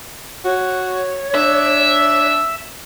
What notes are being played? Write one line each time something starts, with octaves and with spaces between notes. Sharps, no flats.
F#4 C#5
D4 E5